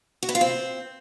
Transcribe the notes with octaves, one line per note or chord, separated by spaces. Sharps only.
F#4
B3
F4
C4